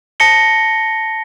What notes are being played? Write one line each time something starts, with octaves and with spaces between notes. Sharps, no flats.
A5 A#6 C#7 G7